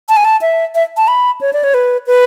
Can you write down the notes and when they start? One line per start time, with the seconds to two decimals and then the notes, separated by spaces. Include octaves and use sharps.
0.09 A5
0.17 G#5
0.25 A5
0.42 E5
0.75 E5
0.97 A5
1.08 B5
1.41 C#5
1.53 D5
1.64 C#5
1.74 B4
2.07 B4